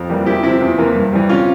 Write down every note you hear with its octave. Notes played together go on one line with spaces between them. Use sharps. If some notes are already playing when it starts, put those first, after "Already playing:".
Already playing: F2
E3 G3 A#3
E2 E4 G4
C3 F3 C4 E4
E2
C3 E3 A#3
G2
E3 G3
C3 C#4 F4